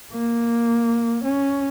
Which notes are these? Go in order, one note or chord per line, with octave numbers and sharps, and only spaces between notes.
A#3
C#4